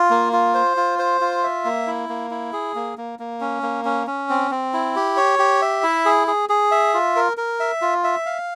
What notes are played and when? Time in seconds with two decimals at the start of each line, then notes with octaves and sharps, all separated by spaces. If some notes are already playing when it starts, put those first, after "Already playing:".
Already playing: F4
0.10 A#3
0.33 F4
0.54 C5
0.77 F4
0.99 C5
1.21 F4
1.43 E5
1.65 A#3
1.87 E4
2.09 A#3
2.31 E4
2.53 G#4
2.75 A#3
2.98 A#3
3.19 A#3
3.41 C#4
3.63 A#3
3.85 C#4
4.07 C#4
4.30 C4
4.51 C4
4.74 E4
4.96 G4
5.17 C#5
5.39 G4
5.62 E5
5.83 E4
6.05 G#4
6.27 G#4
6.49 G#4
6.72 E5
6.94 F4
7.16 A#4
7.37 A#4
7.60 E5
7.81 F4
8.04 E5
8.26 F5